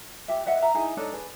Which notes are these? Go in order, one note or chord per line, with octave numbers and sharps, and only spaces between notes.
G4 E5
B4 D#5 E5 F#5
E5 A#5
D#4 E4 G#4
D4 D#4 A4 C#5
G#4 B4